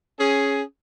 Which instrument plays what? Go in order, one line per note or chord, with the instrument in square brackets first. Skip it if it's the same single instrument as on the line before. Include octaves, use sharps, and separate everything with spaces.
[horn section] C#4 G#4